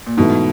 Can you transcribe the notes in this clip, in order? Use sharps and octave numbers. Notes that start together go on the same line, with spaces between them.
A#2
G#2 B2 E3 A3